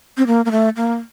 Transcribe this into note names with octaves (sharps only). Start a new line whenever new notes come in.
C4
A#3
A#3
A3
A#3